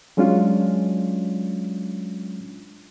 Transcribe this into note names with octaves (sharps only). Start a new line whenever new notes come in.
F#3 G#3 C#4 D4 F4